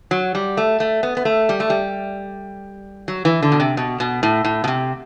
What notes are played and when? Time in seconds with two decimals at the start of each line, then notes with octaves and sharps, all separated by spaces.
0.11 F#3
0.35 G3
0.57 A3
0.80 A3
1.03 B3
1.17 B3
1.25 A3
1.49 G3
1.60 A3
1.70 G3
3.08 F#3
3.25 E3
3.43 D3
3.52 B2
3.60 C3
3.77 B2
4.00 B2
4.23 A2
4.45 A2
4.64 B2
4.68 C3